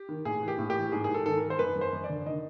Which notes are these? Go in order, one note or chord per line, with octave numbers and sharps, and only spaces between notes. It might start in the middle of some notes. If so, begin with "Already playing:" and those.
Already playing: G4
D#3
A2 G#4
E3
G4
A2
G4
E3
G#2 G#4
G#2 G#4
A4
D#3 A4
D#3 A#4
C5
F#2 B4
F#2
C5
F#2
D5
D3
D#3 D#5